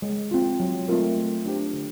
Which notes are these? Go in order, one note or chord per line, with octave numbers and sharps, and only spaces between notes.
G#3
C4 F4
F#3
A3 C4 F4 A#4
A3
D4 G4 C5
D3